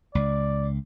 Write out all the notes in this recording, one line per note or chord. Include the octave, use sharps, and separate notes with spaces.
C#2 D5